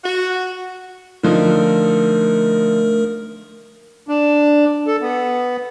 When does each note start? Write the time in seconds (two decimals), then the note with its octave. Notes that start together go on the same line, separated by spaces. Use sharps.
0.04 F#4
1.23 D3 F3 A3 D#4 A#4
4.08 D4
4.87 A4
5.01 B3